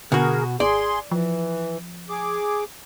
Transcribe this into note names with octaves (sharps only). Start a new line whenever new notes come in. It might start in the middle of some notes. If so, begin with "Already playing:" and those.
B2 D3 F#4 G#4 A#4
G#1 G#4 D5 C6
E3 F3
G#4 D6